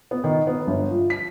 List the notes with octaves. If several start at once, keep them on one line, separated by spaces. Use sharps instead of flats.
B3
D#3
B3
G1
F3
B6